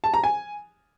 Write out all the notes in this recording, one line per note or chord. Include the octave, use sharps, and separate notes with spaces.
A5
A#5
G#5